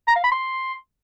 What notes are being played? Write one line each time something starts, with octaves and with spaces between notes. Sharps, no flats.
A#5
F5
B5
C6